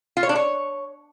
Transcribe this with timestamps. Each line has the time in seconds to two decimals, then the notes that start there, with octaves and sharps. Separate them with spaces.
0.17 F4
0.23 C#5
0.29 D4
0.35 C#5